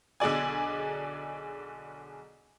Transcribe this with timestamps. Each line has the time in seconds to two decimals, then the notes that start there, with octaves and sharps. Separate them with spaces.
0.20 B1 D3 G#4 D5 G#5